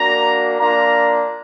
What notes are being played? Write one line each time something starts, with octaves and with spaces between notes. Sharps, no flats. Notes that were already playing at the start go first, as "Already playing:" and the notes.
Already playing: A#3 D4 F#4 A#5
A#3 D4 F4 A#5